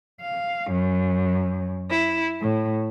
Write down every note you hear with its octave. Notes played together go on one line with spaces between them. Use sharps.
F5
F#2
E4
A2